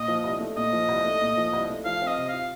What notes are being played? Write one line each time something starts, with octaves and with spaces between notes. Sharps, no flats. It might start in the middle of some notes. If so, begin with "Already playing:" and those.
Already playing: A#2 D#5
F3
C2
A3
A#2 D#5
F3
C2
A3
A#2
F3
C2
A3
F3 F5
C4
D#5
C3
F4 F5